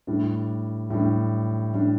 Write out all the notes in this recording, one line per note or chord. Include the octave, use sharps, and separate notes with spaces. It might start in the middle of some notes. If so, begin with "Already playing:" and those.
A2 G3 D4
A2 G3 D4
A2 G3 D4